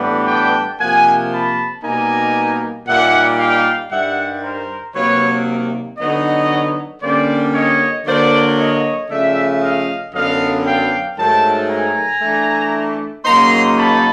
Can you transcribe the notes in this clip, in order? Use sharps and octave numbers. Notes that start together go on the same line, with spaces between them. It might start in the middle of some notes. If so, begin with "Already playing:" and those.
Already playing: A2 E3 G3 B3 D4
G5 A5
C3 F3 A#3 F#5 G#5
A5 B5
B2 G3 A#3 D#4 G#5 A#5
A#2 G3 A#3 D#4 E5 F#5
F5 G5
G2 D#3 G3 E5 F#5
A#4 C5
C3 D#3 F#3 A#3 B4 C#5
D3 F#3 B3 D#4 C#5 D#5
D3 G3 A#3 C#4 C5 D5
C#5 D#5
D3 F#3 A#3 C5 D5
C#5 D#5
C#3 F3 A3 D5 E5
D#5 F5
F#2 D3 F#3 B3 D4 D#5 F5
F5 G5
G#2 D#3 F#3 A3 G5 A5
G#5 A#5
E3 A3 D4
C#3 F#3 A#3 D#4 A#5 C6
A5 B5